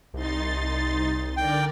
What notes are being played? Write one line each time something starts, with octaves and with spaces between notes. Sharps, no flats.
C2 D#4 C6 A6
D3 A#4 D5 G5